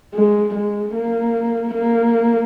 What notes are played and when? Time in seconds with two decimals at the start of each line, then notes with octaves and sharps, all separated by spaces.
0.15 G#3
0.55 G#3
0.94 A#3
1.74 A#3